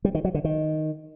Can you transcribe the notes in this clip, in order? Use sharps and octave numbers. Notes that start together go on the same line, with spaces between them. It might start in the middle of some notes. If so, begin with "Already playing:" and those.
G3
D#3
F#3
D3
D#3